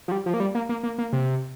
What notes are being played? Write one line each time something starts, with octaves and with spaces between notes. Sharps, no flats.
F3
G3
F3
A#3
G3
A#3
A#3
A#3
A#3
C3